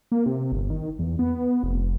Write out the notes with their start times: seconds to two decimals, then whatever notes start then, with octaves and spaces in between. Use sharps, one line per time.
0.12 A#3
0.26 C3
0.52 G1
0.70 D#3
0.99 E2
1.19 B3
1.63 F1